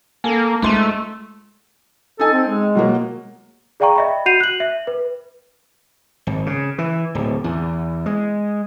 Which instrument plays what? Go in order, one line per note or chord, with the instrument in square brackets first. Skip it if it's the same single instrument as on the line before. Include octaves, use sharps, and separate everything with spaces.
[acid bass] A#3 [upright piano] A4 G#5
[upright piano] G#2 C6 D#7 [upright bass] G#3 F4 [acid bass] A3
[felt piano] D#4 G#5 [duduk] A4
[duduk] C4
G#3
[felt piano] B2 F#3 A#3
[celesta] G#4 D5 F5 G5 A#5 C#6
D#5 E5 B5
F#4 F#5 G6 C7 D#7 F7
F#6 F#7
E5
B4
[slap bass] G#1
C#3
E3
D1
E2
G#3